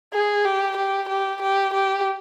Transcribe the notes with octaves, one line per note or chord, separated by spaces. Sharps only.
G#4
G4
G4
G4
G4
G4